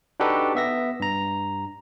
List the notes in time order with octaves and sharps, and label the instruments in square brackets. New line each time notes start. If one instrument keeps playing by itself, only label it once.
[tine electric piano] D4 D#4 F#4 G4 A4 B4
B3 E5 A#6
G2 A#5